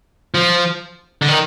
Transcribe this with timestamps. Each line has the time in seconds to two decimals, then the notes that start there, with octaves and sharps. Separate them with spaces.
0.34 F3
1.22 D3
1.28 D#3